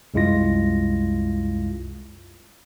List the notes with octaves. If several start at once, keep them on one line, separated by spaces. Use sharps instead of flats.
C2 F#2 G#3 E4 F4 A#6